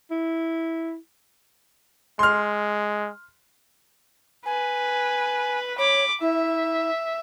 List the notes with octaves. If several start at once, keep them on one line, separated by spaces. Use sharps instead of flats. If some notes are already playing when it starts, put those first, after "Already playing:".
E4
G#3 C6 F6
B4 G#5
C#5 B5 D6
E4 E5